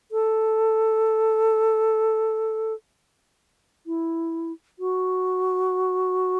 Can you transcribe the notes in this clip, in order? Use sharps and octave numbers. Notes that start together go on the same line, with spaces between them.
A4
E4
F#4